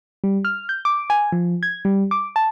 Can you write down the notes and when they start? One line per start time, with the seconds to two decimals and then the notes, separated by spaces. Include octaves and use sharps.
0.24 G3
0.45 F6
0.69 G6
0.85 D6
1.10 G#5
1.32 F3
1.63 G#6
1.85 G3
2.11 D6
2.36 A5